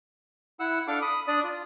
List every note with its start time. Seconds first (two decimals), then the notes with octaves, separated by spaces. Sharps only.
0.60 E4 F#5 E6
0.87 D4 A4 F5 D6
1.02 B5 D#6
1.28 D4 D5 D#6
1.44 F4